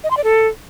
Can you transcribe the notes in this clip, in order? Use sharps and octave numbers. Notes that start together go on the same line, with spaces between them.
D#5
C6
D5
A4